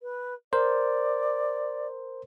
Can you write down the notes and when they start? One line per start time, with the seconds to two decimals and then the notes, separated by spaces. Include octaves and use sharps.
0.02 B4
0.53 A#4 C5 D5